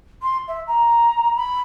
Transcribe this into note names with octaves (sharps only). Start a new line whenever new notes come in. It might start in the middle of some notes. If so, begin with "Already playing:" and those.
C6
E5
A#5
B5